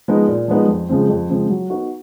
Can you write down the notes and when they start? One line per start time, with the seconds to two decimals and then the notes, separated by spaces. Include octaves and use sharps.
0.08 F3 G#3 B3 D#4
0.28 A#2
0.48 F3 G#3 B3 D#4
0.68 F2
0.89 C#3 F3 G#3 C4
1.09 F2
1.29 C#3 F3 G#3 C4
1.49 F#3
1.70 B3 D#4 F#4